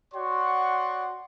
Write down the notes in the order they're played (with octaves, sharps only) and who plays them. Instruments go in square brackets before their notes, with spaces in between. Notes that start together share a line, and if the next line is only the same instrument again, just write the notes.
[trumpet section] F#4 C#5 D5 F#5 C6 C#6